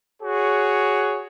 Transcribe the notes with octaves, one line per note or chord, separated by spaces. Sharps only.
F#4 G#4 C#5